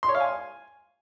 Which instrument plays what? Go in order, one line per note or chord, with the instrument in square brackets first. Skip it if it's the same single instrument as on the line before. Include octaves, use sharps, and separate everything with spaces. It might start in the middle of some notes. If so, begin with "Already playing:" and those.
[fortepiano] C6
C#5
F5
G#5